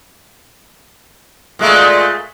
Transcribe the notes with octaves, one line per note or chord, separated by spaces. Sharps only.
A#2 G#3 A3